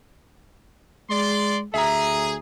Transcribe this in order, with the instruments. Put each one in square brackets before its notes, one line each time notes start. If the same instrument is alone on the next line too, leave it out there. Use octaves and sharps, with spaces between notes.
[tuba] G#3 [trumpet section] D5 C6
[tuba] D2 [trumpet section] G#4 [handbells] E5 A#5